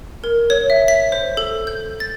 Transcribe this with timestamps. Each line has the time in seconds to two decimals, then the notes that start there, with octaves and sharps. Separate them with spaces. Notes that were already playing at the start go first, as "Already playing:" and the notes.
0.24 A#4
0.50 C#5
0.70 E5
0.88 B6
1.12 C5
1.37 A4
1.67 G6
2.00 A6